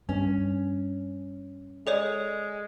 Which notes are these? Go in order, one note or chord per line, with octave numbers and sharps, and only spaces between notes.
G2 C#4
G#3 A4 C#5 D5